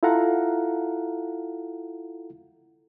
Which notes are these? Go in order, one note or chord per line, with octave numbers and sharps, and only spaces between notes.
E4 F4 A4 F5 F#5 A#5